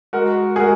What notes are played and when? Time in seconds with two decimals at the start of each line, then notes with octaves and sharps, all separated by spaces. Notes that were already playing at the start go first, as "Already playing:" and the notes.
0.13 G#3 F#4 A#4
0.56 G#4
0.60 G#3 F#4 A#4